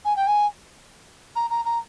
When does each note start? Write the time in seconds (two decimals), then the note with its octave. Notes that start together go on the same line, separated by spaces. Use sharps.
0.05 G#5
0.16 G5
0.27 G#5
1.36 A#5
1.50 A#5
1.65 A#5